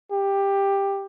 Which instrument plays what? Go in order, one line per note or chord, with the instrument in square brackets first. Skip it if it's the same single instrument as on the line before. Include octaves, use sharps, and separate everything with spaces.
[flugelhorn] G4